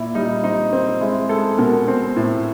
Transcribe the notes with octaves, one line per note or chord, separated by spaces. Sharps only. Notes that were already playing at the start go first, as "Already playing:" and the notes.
Already playing: A#2 E4
G3 D#4
C4 D#4
C4
G#3 E4
G#3 A4
B2 A#4
C4
A2